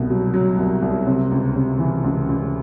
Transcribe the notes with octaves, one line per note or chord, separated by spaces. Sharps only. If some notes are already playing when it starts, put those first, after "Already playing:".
Already playing: C2 B2
F#3
F#3
C2
C2
C3
C#2
C3
E3
C#2
C#2